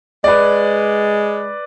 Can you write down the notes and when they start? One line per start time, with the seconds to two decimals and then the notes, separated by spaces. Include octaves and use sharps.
0.24 G#3 B4 D5